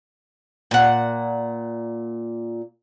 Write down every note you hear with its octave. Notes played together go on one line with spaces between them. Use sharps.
A#2 F#5